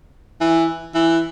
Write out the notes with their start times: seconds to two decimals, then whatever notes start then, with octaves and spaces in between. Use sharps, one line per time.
0.41 E3
0.95 E3